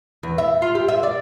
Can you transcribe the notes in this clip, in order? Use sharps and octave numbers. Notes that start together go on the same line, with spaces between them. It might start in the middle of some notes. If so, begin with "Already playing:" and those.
E2
E5
F4
G4
E5
D5